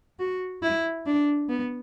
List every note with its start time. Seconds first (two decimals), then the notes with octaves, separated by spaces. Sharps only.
0.19 F#4
0.62 E4
1.06 D4
1.49 B3